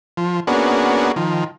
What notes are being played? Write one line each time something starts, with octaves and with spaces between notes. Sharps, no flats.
F3
A#3 B3 C#4 D4 F#4 G#4
D#3 F3